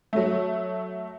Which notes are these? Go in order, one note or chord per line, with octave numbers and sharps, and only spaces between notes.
F#3 A3